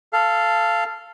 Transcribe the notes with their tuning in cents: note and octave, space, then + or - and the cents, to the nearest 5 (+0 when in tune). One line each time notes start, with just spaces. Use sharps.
A4 +0 F5 -15